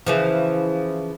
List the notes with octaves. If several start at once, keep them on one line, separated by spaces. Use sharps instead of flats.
C#3 E3 F3